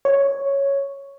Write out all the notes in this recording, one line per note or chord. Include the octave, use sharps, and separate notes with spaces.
C#5